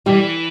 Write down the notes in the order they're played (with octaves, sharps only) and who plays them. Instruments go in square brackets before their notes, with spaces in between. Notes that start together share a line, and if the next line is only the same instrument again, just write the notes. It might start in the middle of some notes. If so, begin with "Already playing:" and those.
[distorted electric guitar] E3 [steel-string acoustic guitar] G3